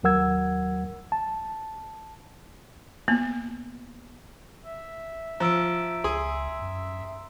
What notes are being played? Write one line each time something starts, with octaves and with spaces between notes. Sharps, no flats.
D#2 F#3 A#4 F#5 E6 G#6
A5
A#3 B3
E5
F3 A#5 E6 D7
C#2 G#4 C6
F#2